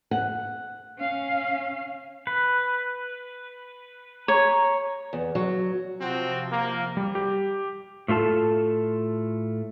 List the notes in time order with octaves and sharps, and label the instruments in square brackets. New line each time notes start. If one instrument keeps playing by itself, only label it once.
[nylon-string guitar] F#5
[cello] C#4 F5
[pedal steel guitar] B4
[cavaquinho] C#5 [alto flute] A#5
[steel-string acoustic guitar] E2
F#3
[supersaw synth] C3 F3 [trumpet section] C4 F#4
[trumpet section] A#3
[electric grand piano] G3
G4
[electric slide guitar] A2 A3 F4 A4 A5